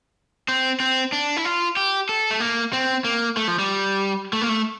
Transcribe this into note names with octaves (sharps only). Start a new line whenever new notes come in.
C4
C4
D4
E4
F4
G4
A4
A3
A#3
C4
A#3
A3
F3
G3
A3
A#3
A3